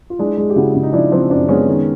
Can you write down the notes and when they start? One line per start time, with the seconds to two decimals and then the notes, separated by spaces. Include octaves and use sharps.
0.10 F4
0.19 G#3 D4 E4
0.38 G#3
0.50 G4
0.56 C#3 E4 F#4
0.75 C#3
0.83 D#4
0.93 F3 D4 E4
1.12 F3 C4 D4
1.30 F#2 C4 D4
1.49 G#3 B3 C#4
1.67 D#3